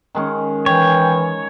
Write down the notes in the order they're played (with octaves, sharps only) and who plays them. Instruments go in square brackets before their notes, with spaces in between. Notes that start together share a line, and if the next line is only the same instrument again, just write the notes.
[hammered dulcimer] D#3 G#3 C#4
[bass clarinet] E3 [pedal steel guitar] C#5 [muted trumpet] G5